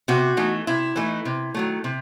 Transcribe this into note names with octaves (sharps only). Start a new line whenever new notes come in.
C3 F#4
E3 A3 D#4
C3 E4
E3 A3 D#4
C3
D#3 F#3 A3
C3